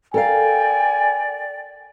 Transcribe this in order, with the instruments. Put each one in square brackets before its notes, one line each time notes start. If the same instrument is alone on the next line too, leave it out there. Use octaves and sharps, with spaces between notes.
[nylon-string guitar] A4 A#4 F5 [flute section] D5 G5 [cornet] G#5